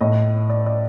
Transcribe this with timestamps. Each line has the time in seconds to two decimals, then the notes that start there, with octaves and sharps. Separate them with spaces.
0.01 A2 D#5
0.50 D5
0.66 D5